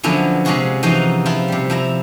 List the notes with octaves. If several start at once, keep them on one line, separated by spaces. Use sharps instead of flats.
D3 F3 F#3 B3 C#4 E4
C3 G#3 C#4 F4 F#4 G#4
E3 F3 D#4 F#4 F5
F3 E4 F4
C3 G3
F3 E4 A#5